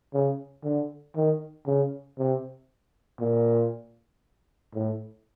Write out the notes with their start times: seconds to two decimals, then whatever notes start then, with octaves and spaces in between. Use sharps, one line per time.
0.14 C#3
0.64 D3
1.16 D#3
1.66 C#3
2.19 C3
3.20 A#2
4.74 A2